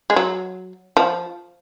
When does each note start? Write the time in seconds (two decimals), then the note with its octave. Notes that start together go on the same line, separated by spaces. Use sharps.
0.10 G#3
0.16 F#3
0.97 F3